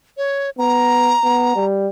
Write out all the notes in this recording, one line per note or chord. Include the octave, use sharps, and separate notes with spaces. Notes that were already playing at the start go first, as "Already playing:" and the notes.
C#5
B3 A#5
B3
G3